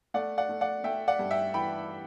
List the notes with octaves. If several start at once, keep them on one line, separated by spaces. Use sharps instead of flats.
A3 D5 F#5
D5 F#5
A3
D5 F#5
A3 E5 G5
D5 F#5
G2
E5 G5
E3 G5 B5